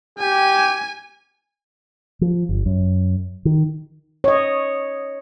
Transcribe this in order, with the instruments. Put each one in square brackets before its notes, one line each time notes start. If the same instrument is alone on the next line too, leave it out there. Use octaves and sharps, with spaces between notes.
[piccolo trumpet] G4 [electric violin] G#5
[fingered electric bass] F3
G1
F#2
D#3
[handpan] C#5 D#5